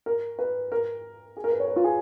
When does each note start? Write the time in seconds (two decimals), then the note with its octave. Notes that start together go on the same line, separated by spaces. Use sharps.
0.06 A#4
0.39 B4
0.72 A#4
1.37 G#4
1.44 A#4
1.52 B4
1.60 C#5
1.68 B4
1.76 F4
1.84 G#4